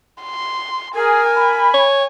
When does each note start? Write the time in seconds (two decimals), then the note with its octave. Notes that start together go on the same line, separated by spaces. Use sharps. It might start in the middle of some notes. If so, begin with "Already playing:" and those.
0.23 C6
0.95 G#4 A#4 G#5
1.36 B5
1.74 C#5